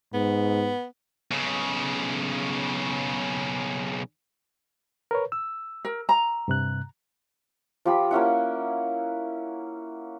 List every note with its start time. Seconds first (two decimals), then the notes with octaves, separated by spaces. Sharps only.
0.14 G#2 B3
1.31 B1 C#3
5.11 A#4 B4 C#5
5.32 E6
5.85 A#4
6.09 A#5
6.48 G2 C3 F#6
7.85 F3 G4 B5
8.11 A#3 C#4 E4 F#5